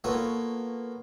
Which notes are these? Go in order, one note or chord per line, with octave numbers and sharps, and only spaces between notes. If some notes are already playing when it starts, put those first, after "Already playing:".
A#3 B3 F4 A4 B4 C#5